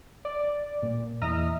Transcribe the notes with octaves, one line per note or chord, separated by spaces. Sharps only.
D5
A#2
E2 D#5 E5 A#5 D#6 F6